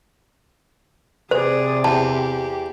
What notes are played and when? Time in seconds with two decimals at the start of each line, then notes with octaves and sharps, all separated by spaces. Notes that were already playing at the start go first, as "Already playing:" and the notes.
1.31 C3 G#4 C5 D5
1.84 E2 G4 A5